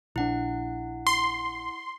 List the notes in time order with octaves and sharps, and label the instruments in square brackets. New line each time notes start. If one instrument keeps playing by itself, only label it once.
[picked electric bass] A#1 D4 [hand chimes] E4 F#5
[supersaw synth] C6